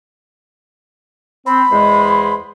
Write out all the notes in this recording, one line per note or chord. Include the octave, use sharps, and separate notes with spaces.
C4 B5
E2 G#3 C5